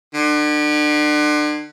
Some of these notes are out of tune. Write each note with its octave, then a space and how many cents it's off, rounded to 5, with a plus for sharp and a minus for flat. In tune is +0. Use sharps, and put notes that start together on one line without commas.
D3 +35